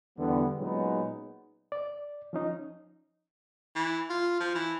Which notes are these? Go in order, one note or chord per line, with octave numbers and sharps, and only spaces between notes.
E2 D3 G3 B3
A#2 F#3 G#3 B3 C#4 D#4
D5
F3 C#4 D#4
E3
F4
F3
E3